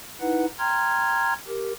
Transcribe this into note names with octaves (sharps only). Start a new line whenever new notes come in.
D#4 E4 B4 F#5
G5 A#5 C6 F6 G#6
G4 A#4